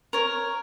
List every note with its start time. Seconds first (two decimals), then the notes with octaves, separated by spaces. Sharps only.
0.13 A#4 C#5